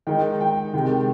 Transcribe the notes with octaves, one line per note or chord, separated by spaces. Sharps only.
D#3 G#3 D#4 G5
G5
C3 D#3 G#3